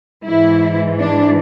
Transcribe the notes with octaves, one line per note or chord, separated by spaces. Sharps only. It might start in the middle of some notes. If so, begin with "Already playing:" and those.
G#2 E3 E4
D4